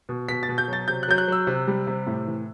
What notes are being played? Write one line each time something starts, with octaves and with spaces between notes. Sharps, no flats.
B2
B2 B6
A6
B2
G6
F#3 A6
C3 G6
F#6
F#3 G6
F#6
F#3 E6
C3
G3
C3
A2
E3